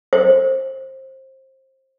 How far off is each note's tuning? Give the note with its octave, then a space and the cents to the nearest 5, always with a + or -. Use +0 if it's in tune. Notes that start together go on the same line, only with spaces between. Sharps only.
C5 +25